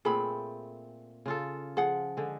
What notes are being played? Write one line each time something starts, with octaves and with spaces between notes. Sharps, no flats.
A#2 A3 C4 G#4 B5
C#3 F4 A4
F3 G#4 F#5
D3 G#3